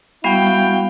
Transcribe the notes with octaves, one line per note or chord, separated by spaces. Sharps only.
G3 B3 E4 F#4 F5 G5